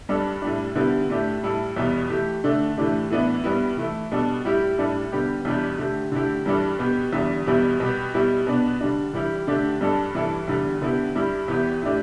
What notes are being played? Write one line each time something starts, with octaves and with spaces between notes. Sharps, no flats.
G2 G3 D4 A4
A2 G3 D4
D3 G3 B3 E4 G4
A2 A3 D4 G4
A2 G3 E4 A4
E2 B2 G3
E3 A3 G4
D3 A3 D4
A2 E3 A3 D4 G4
A2 E3 B3 D4
G2 G3 B3 E4
E3 A3 E4
B2 G3 D4 A4
A2 G3 E4 G4
A2 G3 D4 A4
D3 G3 B3 G4
E2 B2 G3 D4 G4
D3 A3 G4
D3 A3 E4 G4
G2 E3 G3 D4 A4
B2 B3 G4
E2 D3 G3
E2 B2 G3 E4 G4
B2 G3 B3 G4
B2 G3 E4 G4
B2 B3 D4
D3 G3 D4
E3 G3 E4 G4
D3 A3 D4 G4
G2 G3 D4 A4
G2 E3 G3 E4 A4
E2 D3 G3
D3 B3 E4 G4
G2 G3 E4 G4
E2 E3 B3 G4
A2 A3 D4 G4